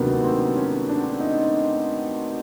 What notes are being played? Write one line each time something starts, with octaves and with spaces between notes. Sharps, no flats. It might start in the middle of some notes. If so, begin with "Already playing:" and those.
Already playing: D2 C3 D#3 F#3 A#3 B3 D4
C4
C#4
D4
D#4